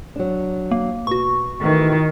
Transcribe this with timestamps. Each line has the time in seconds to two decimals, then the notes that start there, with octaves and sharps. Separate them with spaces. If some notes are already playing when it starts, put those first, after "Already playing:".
0.16 F#3 D4
0.71 A#3
1.07 B2 F#4 C#6
1.61 D#3 E3 A3